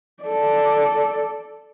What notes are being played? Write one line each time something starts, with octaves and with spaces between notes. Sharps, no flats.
A4 D5